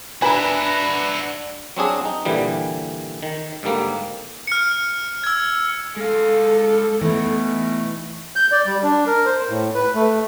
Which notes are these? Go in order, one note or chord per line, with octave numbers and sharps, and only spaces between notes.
D4 F#4 B4 E5 G#5 A#5 B5
F#3 C4 D4 G#4
D#4
A#2 D3 E3 G3
D#3
G#2 D3 G3 A#3
F6 C#7
E6 G#6
G#3 A4 F5
B2 E3 A3 D#4
G6
D5
G3
D4
A#4
C5
A2
B4
A3